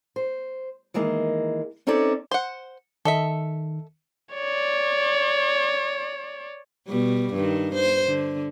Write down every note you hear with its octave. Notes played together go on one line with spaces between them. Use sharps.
C5
D#3 E3 G#3 A#3 D#5
C4 C#4 D#4 A4 C#5 D5
C5 F#5
D#3 A4 D#5 E5
C#5 D5
B2 G3
G2 D#3
C5
D3